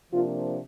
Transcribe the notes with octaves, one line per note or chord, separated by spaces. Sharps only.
C3 F3 A#3 D4 F4